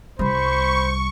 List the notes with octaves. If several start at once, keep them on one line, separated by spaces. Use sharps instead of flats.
C2 G3 C5 B5 C#6